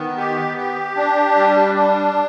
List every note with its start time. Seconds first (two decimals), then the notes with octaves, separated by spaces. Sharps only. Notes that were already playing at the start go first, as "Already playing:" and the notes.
Already playing: D#3 B3
0.17 G4
0.58 G4
0.97 D4
1.36 G3
1.75 D4